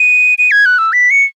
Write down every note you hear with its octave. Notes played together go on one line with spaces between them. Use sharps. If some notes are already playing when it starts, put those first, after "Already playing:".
Already playing: D#7
D#7
G#6
F#6
E6
B6
C#7